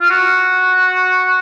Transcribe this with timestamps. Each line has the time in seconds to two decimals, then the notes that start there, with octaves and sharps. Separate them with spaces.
0.01 F4
0.10 F#4